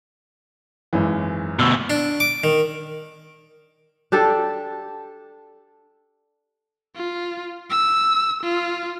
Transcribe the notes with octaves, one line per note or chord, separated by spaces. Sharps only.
G#1 F#2 E3
D2 B2 E6 F6
D4
D6
D#3
D4 G4 A4
F4
E6
F4